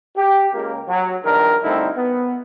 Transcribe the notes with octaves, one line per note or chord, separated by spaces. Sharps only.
G4
C#2 A#3
F#3
A#1 G2 D#3 D4 A#4
D3 G3 A3 C4 D#4 E4
B3